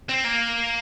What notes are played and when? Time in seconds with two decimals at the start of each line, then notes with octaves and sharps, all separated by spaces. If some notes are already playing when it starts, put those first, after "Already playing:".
0.09 C4
0.24 A#3